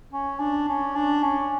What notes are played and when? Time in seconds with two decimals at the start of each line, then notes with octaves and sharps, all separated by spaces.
0.13 C#4
0.40 D4
0.68 C#4
0.95 D4
1.23 C#4